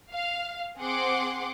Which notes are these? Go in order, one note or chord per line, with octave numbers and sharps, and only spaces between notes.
F5
C4 G#4 F#5 C6 D6